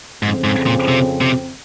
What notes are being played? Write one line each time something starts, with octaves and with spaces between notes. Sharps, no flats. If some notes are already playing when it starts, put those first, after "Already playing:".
F2 G#2 C#3 F3 C4
G#2
A#2
C3
C3